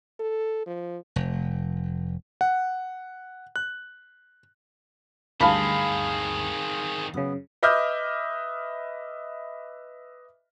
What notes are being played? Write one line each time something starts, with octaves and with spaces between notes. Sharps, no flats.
A4
F3
F1
F#5
F#6
D2 G2 D#3 C4 G#4 F5 A5 B5
F#2 C#3 B3
B4 D#5 E5 D6 F6 G6